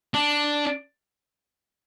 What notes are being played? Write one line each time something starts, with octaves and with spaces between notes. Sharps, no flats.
D4